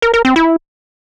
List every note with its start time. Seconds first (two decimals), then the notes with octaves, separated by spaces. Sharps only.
0.02 A#4
0.14 A#4
0.25 C4
0.36 E4